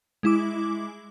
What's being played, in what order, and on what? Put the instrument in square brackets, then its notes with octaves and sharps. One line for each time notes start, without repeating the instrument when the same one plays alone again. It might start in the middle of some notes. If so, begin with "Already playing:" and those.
[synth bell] G#3 E4 D6